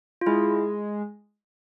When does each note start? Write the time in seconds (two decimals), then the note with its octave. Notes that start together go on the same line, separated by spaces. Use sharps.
0.21 F4
0.26 G#3 E4